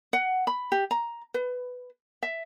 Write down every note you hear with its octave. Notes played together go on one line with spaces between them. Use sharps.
F#5
B5
G4
A#5
B4
E5